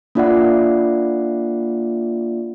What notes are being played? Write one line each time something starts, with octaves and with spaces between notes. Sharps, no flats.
A#3 D4 F4 D5 E5 F#5